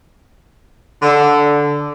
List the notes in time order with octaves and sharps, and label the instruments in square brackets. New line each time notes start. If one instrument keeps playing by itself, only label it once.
[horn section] D3